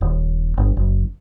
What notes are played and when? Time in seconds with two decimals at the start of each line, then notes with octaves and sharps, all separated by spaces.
0.01 D#1
0.57 G1
0.77 F#1